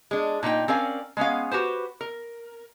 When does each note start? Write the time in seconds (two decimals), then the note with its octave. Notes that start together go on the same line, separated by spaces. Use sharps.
0.11 G#3 D4
0.43 A#2 D#4 E4 G5
0.68 C4 C#4 A#4 D5 F5
1.17 G#3 B3 C#4 F5
1.51 F#4 G4 B4 C5
2.01 A#4